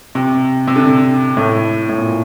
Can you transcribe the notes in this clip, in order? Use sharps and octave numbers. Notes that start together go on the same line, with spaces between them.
C3
C3
D3
A2
A2
A#2